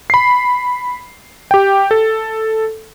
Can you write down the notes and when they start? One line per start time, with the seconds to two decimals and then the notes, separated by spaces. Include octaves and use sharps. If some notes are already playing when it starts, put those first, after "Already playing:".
0.10 B5 C7
1.51 G4 G5
1.91 A4